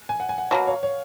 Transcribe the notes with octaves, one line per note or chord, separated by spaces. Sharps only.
G#5
F#5
G#5
F#5
B2 F#3 A#3 F5
C#5
C#5